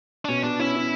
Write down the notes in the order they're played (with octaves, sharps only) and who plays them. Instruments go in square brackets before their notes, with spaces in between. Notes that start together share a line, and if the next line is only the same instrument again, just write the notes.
[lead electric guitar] D4
[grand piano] B2 [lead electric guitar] C#4
[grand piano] B2 [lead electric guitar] D4
[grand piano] C#4 [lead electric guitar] E4
[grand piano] C#4